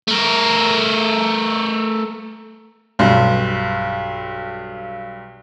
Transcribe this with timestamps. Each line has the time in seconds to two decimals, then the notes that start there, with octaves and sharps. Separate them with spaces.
0.08 A3 A#4
2.99 B1 G2 C6